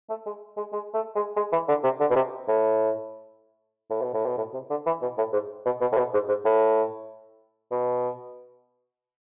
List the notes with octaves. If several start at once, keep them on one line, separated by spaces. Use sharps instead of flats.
A3
G#3
G#3
G#3
A3
G#3
G#3
E3
D3
C3
D3
B2
C3
A2
A2
B2
A2
B2
A2
C3
D3
E3
B2
A2
G#2
B2
B2
A2
B2
G#2
G#2
A2
B2